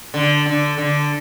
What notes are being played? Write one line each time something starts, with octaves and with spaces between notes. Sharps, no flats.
D3
D3
D3